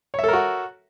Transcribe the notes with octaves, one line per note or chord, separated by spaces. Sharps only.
F#4 A4 A#4 C#5 E5